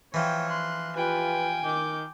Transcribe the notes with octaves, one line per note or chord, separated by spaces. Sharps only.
E3 F3 C#5 G5
C6 F#6
F4 G4 B4 G5 G#5
D#3 D6 G6